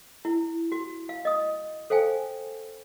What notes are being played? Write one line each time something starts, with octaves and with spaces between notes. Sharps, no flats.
E4
F#4
F5
D#5 D#6
A4 C5 F5 G5 G#5